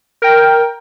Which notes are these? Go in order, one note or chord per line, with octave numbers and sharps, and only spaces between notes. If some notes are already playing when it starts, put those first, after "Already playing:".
A#4 G5